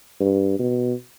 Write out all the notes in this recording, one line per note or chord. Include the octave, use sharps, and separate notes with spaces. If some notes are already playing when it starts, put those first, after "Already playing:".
G2
B2